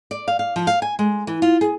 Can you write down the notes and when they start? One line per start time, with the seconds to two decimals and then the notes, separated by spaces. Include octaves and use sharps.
0.11 D5
0.28 F5
0.39 F5
0.56 F3
0.67 F5
0.82 G#5
0.99 G#3
1.27 E3
1.42 F4
1.61 G#4